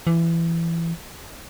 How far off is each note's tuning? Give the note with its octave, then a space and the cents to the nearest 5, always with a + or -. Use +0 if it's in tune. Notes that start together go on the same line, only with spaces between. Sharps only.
E3 +20